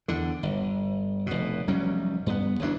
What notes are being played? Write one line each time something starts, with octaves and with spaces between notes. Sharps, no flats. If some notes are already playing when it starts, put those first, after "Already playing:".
E2 D3
G1
F1 B2
F1 F#3 G3 C#4
G2 B3
G1 D2 E3 D4